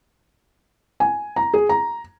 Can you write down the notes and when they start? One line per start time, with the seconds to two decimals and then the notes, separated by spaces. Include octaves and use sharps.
1.00 G#5
1.36 A#5
1.54 G#4
1.69 A#5